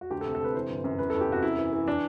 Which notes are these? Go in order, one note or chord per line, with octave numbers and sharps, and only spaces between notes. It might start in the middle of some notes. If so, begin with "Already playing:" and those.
F#4
D2 G4
C3 A4
A4
C3 B4
E3 C5
G1
F#2
E2 B4
E2 A4
G4
C3 F#4
F#2 E4
E3
E3
D4